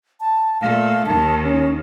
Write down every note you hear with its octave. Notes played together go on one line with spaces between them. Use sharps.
A5
A#2 A3 F5
D#2 D#3 A5
C#4